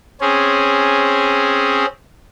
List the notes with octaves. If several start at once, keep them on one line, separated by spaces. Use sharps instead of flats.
C4 C#4 G#4